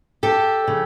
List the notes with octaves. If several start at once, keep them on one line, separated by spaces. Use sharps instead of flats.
G4 A4
C#3 F3